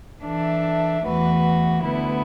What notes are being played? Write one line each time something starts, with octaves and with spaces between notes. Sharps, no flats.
E3 D4 A4 E5
E2 E3 A3 F#4 B4
D2 D3 B3 E4 B4